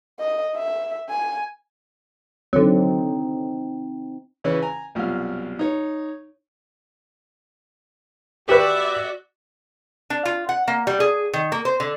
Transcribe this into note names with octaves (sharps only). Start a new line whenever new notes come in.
D#5
E5
G#5
D3 F#3 C4 D#4
C#3 E3 C#4 B4
G#5 A#5
C2 F#2 B2 F4 F6
D#4 C#5
F#4 G4 B4 D5 E5
D4
F4
F#5
A#3
G3
G#4
D#3
A#3
C5
D3